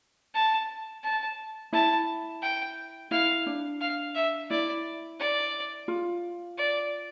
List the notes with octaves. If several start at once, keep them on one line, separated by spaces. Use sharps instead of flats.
A5
A5
E4 A5
G5
E4 F5
D4
F5
E5
E4 D5
D5
F4
D5